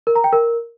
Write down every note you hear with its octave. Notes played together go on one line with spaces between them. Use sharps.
A#4
A#5
G5
A#4